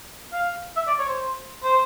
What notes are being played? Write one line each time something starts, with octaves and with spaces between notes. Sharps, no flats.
F5
E5
D5
C#5
C5
C5